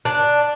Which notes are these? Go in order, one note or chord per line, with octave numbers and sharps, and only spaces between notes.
D4